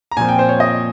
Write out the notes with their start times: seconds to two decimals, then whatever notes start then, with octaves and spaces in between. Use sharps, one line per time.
0.11 A#5
0.17 A#2 F3 C4 G#5
0.28 G5
0.39 C5
0.49 C#5
0.60 D#5